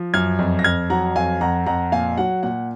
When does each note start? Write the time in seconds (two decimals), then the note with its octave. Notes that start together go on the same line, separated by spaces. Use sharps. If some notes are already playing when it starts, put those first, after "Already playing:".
Already playing: F3
0.14 F#2 F6 G#6
0.39 F2
0.59 A#6
0.64 F2 F6 G#6
0.90 F#3 F#5 A#5
1.16 F2 F5 G#5
1.41 F2 F#5 A#5
1.66 F2 F#5 A#5
1.92 A#2 F5 G#5
2.17 F#3 F#5
2.43 A#2 F#5